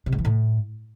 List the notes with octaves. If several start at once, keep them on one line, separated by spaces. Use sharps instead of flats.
C3
G#2
E3
A2